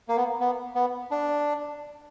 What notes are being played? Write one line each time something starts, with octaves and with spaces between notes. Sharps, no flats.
A#3
B3
B3
B3
D4